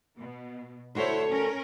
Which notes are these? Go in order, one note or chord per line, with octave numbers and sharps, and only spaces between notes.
B2
D2 E4 F#4 A4 C5 C#5
C#4 A#4